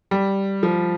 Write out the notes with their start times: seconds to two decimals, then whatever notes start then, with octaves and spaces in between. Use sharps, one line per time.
0.11 G3
0.63 F3